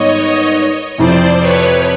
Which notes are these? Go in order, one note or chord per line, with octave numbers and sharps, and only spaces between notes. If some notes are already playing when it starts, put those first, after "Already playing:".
Already playing: G#2 D#3 G3 B3 C#5 D#5
F2 C3 E3 C5 D5
B4 C#5